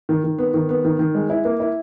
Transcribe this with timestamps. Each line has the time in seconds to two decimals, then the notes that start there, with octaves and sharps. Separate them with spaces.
0.09 D#3
0.24 D#3
0.38 B3
0.54 D#3
0.69 B3
0.85 D#3
0.99 D#3
1.15 G#3
1.30 E4
1.45 A#3
1.60 E4